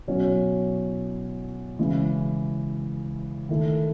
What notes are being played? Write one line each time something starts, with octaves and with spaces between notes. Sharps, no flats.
B2 F#3 C#4 E4
C#3 E3 G#3
D#3 A3 E4